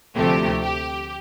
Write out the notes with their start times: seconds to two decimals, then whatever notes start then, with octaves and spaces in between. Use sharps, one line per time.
0.16 D2 C3 F3 A3 G4
0.62 G4